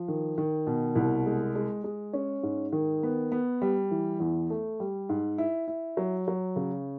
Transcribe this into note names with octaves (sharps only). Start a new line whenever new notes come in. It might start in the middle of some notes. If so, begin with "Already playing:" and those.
Already playing: F3
D#3
D#3
B2
C2
G#3
G#3
G#3
C#4
G#2
D#3
B3
B3
G3
E3
E2
A3
G3
G#2
E4
E4
F#3
F#3
C#3